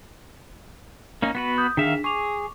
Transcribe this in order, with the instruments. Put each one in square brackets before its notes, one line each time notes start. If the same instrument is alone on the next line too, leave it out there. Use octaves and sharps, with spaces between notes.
[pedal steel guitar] A#3 C#4 D#4
B3 F#4 B4
[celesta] D#6 G6
[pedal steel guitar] D#3 E5 F5 [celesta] D4 G#4 B6
[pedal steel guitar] G#4 [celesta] C#6 D6 F7